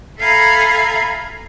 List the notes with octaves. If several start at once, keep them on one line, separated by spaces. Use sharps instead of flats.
A4 E5 F5 G#5 A#5 B5